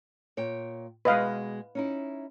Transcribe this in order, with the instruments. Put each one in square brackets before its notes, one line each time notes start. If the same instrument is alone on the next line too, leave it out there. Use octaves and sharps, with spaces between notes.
[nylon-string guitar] A#2 C#5 G5
[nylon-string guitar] B2 G#3 [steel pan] B4 D#5 F5
[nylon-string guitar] C#4 D#4 E4